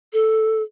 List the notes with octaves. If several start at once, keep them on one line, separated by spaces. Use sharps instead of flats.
A4